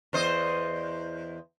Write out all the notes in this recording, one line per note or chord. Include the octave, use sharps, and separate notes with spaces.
E2 C5 D#5